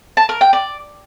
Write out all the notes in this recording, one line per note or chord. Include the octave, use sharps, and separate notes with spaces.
A5
A#4
G5
D5